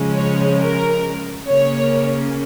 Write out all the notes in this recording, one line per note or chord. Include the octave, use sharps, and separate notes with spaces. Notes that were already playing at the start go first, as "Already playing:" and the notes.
Already playing: C#3 F3 G#3 C#4
C#5
A#4
C#3 A#3 C#4 C#5